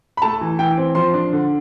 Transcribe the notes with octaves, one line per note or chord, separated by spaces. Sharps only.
B5
A3 A5
E3
E3 G5
C4
F3 C6
D4
D3